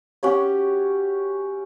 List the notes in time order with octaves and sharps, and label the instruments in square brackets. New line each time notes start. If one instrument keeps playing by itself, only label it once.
[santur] C#4 F#4 G4 C#5